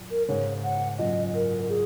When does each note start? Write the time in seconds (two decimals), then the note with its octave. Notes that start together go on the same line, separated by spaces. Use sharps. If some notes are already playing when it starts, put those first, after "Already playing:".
Already playing: F#2 A#2
0.11 A#4
0.28 G#2 C#3 C#5
0.64 F#5
0.99 F#2 A#2 D#5
1.35 A#4
1.69 G#4